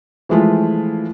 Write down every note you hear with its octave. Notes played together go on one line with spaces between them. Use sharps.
E3 F3 G#3 A3 F4